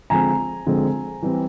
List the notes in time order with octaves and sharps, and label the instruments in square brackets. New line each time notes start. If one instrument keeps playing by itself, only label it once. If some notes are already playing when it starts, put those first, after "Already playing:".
[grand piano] D3 F3 G#3 C4 G#5 A#5
D3 F3 G#3 C4
E3 G3 C4